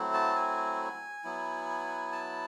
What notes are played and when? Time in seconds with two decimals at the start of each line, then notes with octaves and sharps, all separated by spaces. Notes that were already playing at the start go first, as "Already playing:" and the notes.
Already playing: F#3 A3 C4 E4
0.14 A5
0.36 G#5
1.24 F#3 B3 E4
2.12 A5